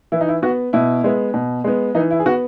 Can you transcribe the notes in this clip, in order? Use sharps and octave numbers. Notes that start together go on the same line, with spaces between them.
E3 E4
D#4
E4
B3 F#4
B2 E4
G#3 B3
B2
G#3 B3
E3 D#4
E4
G#4
B3 F#4